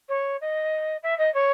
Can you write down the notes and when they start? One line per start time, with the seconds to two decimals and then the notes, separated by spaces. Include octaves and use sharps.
0.09 C#5
0.41 D#5
1.03 E5
1.18 D#5
1.34 C#5